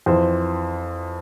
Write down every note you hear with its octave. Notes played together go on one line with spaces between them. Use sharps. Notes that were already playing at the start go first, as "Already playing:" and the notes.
F2 E3 C5